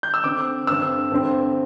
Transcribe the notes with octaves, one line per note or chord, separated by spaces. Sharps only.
G6
E6
D3 C4 D6
G2 D3 C4 E6
G2 D3 C4